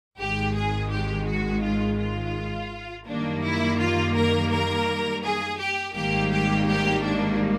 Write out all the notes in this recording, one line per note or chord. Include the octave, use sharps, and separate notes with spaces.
G#1 G#2 D#3 G#3 G4
G#4
G4
F#4
F4
F4
F#2 D#3 G3 A#3 D4
E4
F4
A#4
A#4
G#4
G4
G#1 G#2 D#3 G3 A#3 G4
G4
G4
D4